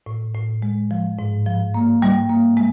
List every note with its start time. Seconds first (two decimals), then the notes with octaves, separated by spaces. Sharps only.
0.06 A2
0.34 A2
0.62 G#3
0.91 F3
1.19 G#2
1.46 F3
1.74 A#3
2.02 G3
2.30 A#3
2.57 G#3